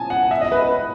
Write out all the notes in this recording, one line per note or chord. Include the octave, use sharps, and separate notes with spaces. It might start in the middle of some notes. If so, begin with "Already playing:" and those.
Already playing: G#5 A5
F#5
E5
D#5
B4
B4